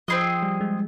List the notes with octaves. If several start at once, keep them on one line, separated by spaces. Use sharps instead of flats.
F3 C4 F4 G#4 D#5
G3
G#3